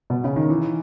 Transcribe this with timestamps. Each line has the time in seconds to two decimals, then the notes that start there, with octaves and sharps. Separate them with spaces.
0.10 B2
0.24 C#3
0.36 D#3
0.50 E3